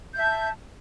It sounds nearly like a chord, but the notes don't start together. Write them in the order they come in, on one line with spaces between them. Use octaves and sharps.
G6 E5 A5